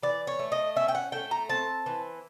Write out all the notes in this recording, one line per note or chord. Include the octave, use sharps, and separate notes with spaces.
E3 D5
C#5
A3
D#5
C#4 E5
G5
F#5
A3 G5
A#5
C4 A5
E3